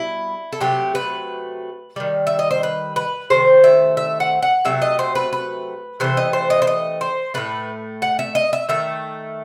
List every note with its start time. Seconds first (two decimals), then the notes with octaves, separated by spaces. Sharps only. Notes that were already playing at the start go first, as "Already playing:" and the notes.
Already playing: B2 G3 E4
0.52 A4
0.61 C3 F#3 A3 G4
0.95 B4
1.96 D#3 G3
2.27 E5
2.39 D#5
2.51 C5
2.63 B4
2.96 B4
3.30 C3 D#3 A3 C5
3.64 E5
3.97 E5
4.20 F#5
4.43 F#5
4.65 C3 F#3 A3 E5
4.82 D#5
4.99 C5
5.15 B4
5.33 B4
6.00 C3 E3 A3 C5
6.17 D#5
6.33 C5
6.50 D#5
6.62 C5
6.67 D#5
7.01 C5
7.34 A2 F#3 A3 B4
8.02 F#5
8.19 E5
8.35 D#5
8.53 E5
8.69 D#3 A3 E5